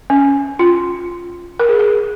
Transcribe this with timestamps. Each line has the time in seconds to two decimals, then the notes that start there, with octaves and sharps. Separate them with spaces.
0.10 C#4
0.59 F4
1.60 A#4
1.69 G#4
1.79 A#4